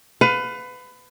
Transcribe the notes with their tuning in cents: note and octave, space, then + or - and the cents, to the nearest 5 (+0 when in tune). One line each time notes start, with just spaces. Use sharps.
B4 +25 F5 +30